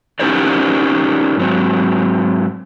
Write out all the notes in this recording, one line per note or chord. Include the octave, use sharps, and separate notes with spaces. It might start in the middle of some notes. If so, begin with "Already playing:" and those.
C#4 D#4 G4 A#4 C5 D5
G#2 F#3 C4